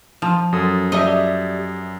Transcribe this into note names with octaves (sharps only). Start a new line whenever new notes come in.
F3
F#2 A4 D#6
G3 G4 D#5 E5